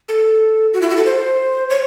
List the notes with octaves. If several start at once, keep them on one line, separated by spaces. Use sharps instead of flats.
A4
F#4
E4
F#4
A4
C5
C#5